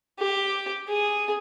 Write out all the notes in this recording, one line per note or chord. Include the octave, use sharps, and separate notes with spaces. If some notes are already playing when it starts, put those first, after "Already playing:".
G4
G#4